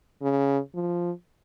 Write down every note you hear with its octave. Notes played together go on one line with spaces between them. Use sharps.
C#3
F3